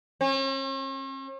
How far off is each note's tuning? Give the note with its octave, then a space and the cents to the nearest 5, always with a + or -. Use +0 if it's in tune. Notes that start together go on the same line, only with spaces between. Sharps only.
C#4 -45